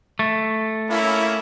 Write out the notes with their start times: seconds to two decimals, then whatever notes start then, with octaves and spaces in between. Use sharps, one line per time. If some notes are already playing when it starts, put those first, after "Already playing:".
0.19 A3
0.90 A#3 C#4 E4